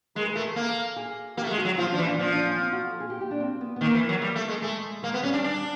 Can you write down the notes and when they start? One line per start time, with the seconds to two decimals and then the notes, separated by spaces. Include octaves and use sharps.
0.15 G#3 A#4
0.26 B4
0.35 A3 A#4
0.56 A#3 A4
0.96 G#4
1.37 A#3 G4
1.44 A3
1.51 G#3
1.58 F#4
1.65 F#3
1.78 F3 F4
1.92 F3 D4
1.98 E3
2.05 D4
2.18 F3 D4
2.32 D4
2.46 C#4
2.59 C4
2.72 F#4
2.87 A4
3.00 G#4
3.10 G4
3.21 G4
3.31 D4
3.40 C4
3.61 B3
3.76 B3
3.81 D#3 A#3
3.94 E3
4.09 F#3
4.22 G3
4.36 A3
4.48 G#3
4.62 G#3 A3
4.91 A3
5.02 G#3 A#3
5.14 B3
5.23 G3 C#4
5.33 D4
5.44 D4
5.56 G3